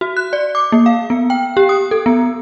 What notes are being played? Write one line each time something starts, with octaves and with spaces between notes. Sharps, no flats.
F#4
F#6
D5
D6
A#3
F5
B3
G5
G4
D#6
A4
B3